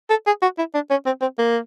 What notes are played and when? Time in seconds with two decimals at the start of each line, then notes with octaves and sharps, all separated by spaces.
0.10 A4
0.27 G#4
0.42 F#4
0.58 E4
0.74 D4
0.90 C#4
1.06 C4
1.21 C4
1.38 A#3